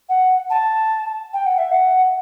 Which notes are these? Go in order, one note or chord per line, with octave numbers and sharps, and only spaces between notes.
F#5
A5
G5
F#5
E5
F#5